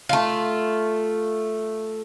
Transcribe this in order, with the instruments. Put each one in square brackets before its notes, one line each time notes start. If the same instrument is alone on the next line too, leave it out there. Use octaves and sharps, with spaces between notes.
[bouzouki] A3 F4